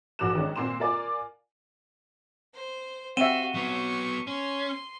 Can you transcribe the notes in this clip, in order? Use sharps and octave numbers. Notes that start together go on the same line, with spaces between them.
F1 A#1 F#4 D6 F#6 E7
D#3 G#3 C#4 D4
A#2 A#3 C4 C6 E7
F4 A#4 D5 G#5 D6
C5
C4 F#4 E5 F5 D#7 E7 G7
F#3 B3 C#6
C#4 C6